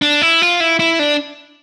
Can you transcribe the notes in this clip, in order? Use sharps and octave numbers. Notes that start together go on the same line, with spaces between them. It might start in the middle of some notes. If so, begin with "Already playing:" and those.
D4
E4
F4
E4
E4
D4